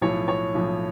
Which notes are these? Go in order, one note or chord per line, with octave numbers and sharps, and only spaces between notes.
B1 A2 F3 C#5
C#5
B1 A2 F3